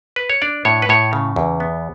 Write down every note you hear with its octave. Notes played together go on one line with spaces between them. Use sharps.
B4
C#5
D4 D5
A2 C#5
B4
A2 C#5
C#3
E2
B3